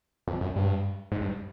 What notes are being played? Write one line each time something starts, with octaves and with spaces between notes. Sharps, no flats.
F2
F#2
G2
G#2
G2